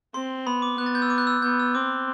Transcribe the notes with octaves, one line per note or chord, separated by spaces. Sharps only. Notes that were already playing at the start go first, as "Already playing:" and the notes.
C4 C6
B3 B5
D6
B3 F#6
A6
G6
E6
D6
F#6
E6
B3 G6
E6
C4 D6